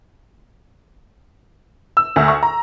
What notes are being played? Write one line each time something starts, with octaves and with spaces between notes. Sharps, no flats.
E6
D2
C#6
A#5